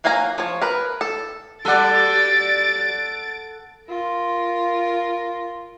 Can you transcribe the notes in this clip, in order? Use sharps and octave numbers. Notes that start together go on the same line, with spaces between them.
F#3 A#3 F5 G#5 A#5
F3 C#5
A#4 B4
A4
F#3 G3 A4 D5 F#5 A6 D7
F4 A#4